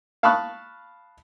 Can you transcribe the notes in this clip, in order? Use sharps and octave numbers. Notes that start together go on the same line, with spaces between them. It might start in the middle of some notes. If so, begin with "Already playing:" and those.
F5 A5 B5 C#6 D#6 F#6